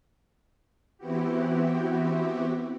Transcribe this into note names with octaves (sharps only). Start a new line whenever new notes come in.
E3 B3 C4 E4 F#4 G4